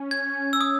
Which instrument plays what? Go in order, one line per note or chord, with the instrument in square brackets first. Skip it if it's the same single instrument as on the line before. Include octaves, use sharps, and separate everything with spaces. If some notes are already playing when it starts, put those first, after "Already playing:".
Already playing: [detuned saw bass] C#4
[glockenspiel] G#6
E6
D#6